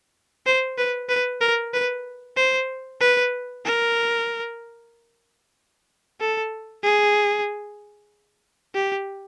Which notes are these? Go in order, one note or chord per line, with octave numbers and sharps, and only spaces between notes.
C5
B4
B4
A#4
B4
C5
B4
A#4
A4
G#4
G4